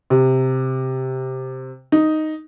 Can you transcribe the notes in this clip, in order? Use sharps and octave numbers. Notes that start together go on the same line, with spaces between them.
C3
D#4